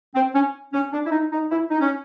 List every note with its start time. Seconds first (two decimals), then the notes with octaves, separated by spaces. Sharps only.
0.15 C4
0.35 C#4
0.73 C#4
0.93 D4
1.05 E4
1.12 D#4
1.32 D#4
1.51 E4
1.70 D#4
1.81 C#4